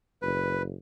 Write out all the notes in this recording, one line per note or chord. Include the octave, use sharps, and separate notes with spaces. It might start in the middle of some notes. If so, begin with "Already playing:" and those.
F#1 B4